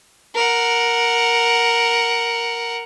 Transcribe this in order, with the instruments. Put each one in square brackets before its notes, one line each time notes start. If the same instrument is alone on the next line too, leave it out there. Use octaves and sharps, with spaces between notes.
[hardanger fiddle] A#4 F#5